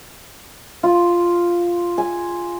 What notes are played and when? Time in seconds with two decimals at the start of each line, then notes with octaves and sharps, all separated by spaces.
0.83 F4
1.98 G#5